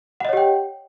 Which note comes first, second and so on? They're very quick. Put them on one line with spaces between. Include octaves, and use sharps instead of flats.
F#5 D#5 C#5 G4 G5